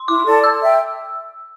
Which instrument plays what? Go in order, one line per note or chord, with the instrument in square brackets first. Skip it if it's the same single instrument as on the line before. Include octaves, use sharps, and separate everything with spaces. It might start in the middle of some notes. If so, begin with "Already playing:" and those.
Already playing: [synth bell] C6
[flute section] E4 [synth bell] D6
[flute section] A4 D5 A5
[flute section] A4 [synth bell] E6
[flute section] E5 G5